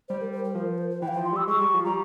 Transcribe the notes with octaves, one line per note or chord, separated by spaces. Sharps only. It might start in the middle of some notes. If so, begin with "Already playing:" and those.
G3 C5
A#4
C5
A#4
F3 C5
A#4
C5
C5
E3 G5
F5
G5
F3
C6
G3 E6
G#3 C#6
G3
F3
G3 A#5